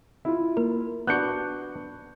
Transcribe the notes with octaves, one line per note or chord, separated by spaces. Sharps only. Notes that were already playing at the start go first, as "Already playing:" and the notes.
E4 F4
A#3 A#4
B3 D4 F#4 F#6 G6 C#7